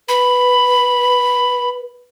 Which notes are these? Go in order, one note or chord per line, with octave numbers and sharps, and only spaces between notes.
B4 B5